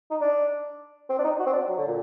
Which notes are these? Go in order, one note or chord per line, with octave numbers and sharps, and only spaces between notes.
D#4
D4
C4
D4
D#4
F#4
C4
D4
F#3
D3
A#2